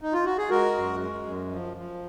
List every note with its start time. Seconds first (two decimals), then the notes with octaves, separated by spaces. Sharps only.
0.01 D#4
0.13 F4
0.25 F#4
0.38 G#4
0.50 G#3 F#4 A#4
0.75 F#2
1.01 G#3
1.26 F#2
1.52 F3
1.77 F3